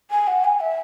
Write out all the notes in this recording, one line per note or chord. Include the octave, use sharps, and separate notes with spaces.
G#5
F#5
G#5
E5